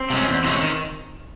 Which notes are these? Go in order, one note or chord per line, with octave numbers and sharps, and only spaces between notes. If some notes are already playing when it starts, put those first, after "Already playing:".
Already playing: C4
C3 E3 G#3 C#4
E2
C3 E3 G#3 C#4
D#3